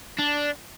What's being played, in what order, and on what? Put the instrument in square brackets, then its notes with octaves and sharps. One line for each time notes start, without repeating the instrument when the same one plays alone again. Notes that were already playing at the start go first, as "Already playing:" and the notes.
[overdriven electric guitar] D4